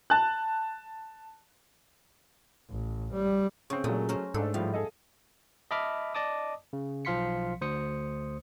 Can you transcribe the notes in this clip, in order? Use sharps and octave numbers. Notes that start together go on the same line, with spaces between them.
A5 F#6
A1
G3
C#3 C4 C#6
A#2 F#3 G#3 A3
C#4 A#4 C5
G#2 A3 D4 A4
A2 F3 G3 F5
G#4 A4 D#5
D#5 E5 A5 B5 D6 F6
D5 D#5 A5 D6 D#6
C#3
B1 F3 F5 C6 B6 C#7
D2 C5 D#6 C#7